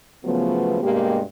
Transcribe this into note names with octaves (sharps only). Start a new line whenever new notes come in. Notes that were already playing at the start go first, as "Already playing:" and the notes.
C#3 F3 F#3 A3 B3
G2 B2 G#3 A#3 G4